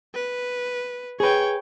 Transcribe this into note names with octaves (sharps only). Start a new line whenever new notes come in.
B4
G#4 B4 C#5 G5